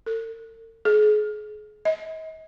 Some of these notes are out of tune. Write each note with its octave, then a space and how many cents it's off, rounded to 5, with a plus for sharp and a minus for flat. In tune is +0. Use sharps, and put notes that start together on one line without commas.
A4 +45
G#4 +35
D#5 +40